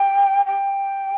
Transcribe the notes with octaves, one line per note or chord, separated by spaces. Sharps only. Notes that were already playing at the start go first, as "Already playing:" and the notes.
Already playing: G5
G5